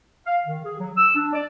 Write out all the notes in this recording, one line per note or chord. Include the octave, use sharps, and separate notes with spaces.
F5
D#3
G#4
F#3
E6
D4
D5